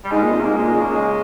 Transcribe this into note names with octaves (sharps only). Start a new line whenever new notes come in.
G3
G#2 G#3
A#2
C3
G#2 A#3
A#2 G#3
C#3 G#3
A#3
G#3